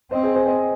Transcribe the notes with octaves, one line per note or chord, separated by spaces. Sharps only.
C4 C5 D#5
G#4 C5
G#4 C5
C5 D#5